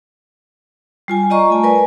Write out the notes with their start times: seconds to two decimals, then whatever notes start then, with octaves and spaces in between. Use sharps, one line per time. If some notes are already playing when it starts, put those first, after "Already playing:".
1.08 G3 F4 G#5
1.30 F4 D5 D#5 A#5 C#6
1.50 A3 G#5
1.64 A#4 B4 D5 G#5